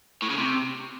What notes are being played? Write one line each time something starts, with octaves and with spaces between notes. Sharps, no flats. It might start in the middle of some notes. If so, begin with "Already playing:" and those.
A2
C#3
C3